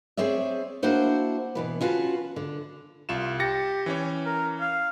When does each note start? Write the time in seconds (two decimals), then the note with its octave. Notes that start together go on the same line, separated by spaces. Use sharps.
0.17 C4 G#4 C#5 D5 E5
0.83 A#3 D4 E4 F#4 C5 F#5
1.55 B2 E3 B3
1.81 C#4 F4 F#4 B4 A5
2.36 D3
3.09 C2 F4 E7
3.40 G4 A6 A#6 C#7
3.86 E3 C#4 C#5
4.26 A#4
4.61 F5